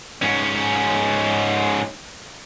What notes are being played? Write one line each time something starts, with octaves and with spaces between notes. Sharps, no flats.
G#2 C#4